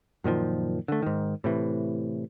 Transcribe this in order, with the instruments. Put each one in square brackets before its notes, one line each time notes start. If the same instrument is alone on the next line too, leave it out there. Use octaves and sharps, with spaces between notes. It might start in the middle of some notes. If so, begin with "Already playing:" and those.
[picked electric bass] F#2 A#2 D#3 F3
D3 A3
G#2 D#3
A2 C3 E3